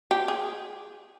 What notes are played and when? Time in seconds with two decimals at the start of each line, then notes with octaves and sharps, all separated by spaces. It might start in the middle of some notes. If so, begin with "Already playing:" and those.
0.11 G4
0.28 G#4